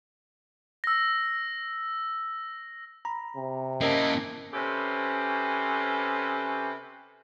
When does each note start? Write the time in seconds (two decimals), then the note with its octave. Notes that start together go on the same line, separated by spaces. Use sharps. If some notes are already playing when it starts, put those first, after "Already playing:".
0.84 E6 A#6
3.05 A#5 B5
3.36 C3
3.81 A#3 C#4 E4 A#4 D#5 A5
4.53 C3 C#4 G4 A4 B4 C5